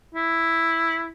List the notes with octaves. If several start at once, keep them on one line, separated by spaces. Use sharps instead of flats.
E4